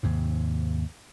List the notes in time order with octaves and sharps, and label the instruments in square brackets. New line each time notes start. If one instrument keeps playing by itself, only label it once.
[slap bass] D#2 G#2 C3